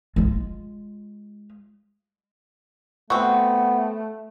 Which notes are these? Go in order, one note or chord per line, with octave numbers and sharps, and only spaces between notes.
G#3 F4
A3 B3 C4 F#4 C#6